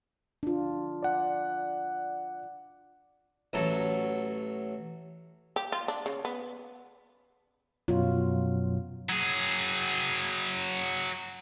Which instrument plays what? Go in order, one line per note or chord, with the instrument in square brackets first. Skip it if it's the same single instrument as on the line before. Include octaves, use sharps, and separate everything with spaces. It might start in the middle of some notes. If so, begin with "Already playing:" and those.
[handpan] D4 F4
[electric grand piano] D5 F#5
[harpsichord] A1 F#3 A4
[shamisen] G4
F4
D4
C#3
B3
[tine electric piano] F#2 B2 F#3 [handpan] F4
[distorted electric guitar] F#3 G#4